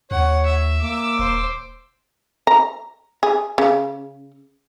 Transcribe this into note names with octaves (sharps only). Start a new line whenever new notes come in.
D#2 C#5 F#5
E5
A#3 D6 E6
D#1 C5
A#5
G#4
C#3